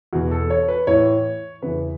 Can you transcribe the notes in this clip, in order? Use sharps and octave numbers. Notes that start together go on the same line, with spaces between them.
E2 B2 F#4
A4
C#5
B4
A2 E3 C#5
E2 C#3 E3 B4